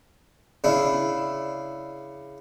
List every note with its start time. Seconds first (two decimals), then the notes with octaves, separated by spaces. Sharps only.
0.64 C#3 D4 E4